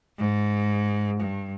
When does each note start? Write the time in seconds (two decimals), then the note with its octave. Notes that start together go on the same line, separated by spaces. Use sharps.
0.19 G#2
1.20 G2